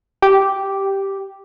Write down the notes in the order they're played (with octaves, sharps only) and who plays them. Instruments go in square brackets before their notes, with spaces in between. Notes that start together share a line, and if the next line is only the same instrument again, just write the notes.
[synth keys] G4